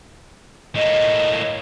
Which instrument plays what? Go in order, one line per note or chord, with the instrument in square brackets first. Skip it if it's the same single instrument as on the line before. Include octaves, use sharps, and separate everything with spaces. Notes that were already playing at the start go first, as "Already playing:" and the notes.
[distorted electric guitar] A2 A#3 [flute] D#5